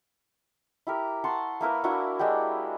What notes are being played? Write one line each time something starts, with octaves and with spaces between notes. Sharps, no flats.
E4 G4 A#4
F#5 A5 C6 C#6
A#3 E4 A#4 B4
A#3 D4 E4 F#4
G#3 D4 F#4 G4